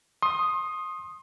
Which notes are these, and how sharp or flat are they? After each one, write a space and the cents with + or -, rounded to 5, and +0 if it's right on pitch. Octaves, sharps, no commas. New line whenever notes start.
C6 +30 D#6 +0